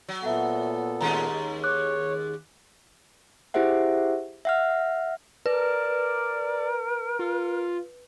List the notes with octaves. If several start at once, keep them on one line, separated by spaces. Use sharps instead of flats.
F#3
A#2 B3 A4 E5 F#5
D#2 G#3 C#4 A#5
C#5 D6 F#6
E4 G4 G#4 C5 E5 F#5
E5 F#5 F6
A#4 B4 D5
F4